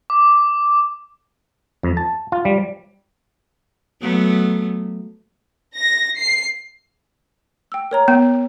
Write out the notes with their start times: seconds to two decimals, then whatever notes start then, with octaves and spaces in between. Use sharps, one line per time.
0.10 D6
1.83 F2
1.97 A5
2.32 F4
2.45 G3
4.01 F#3 A3 B3
5.77 A#6
6.18 C7
7.72 G5 E6
7.91 A#4 C#5 A#5
8.08 B3 G5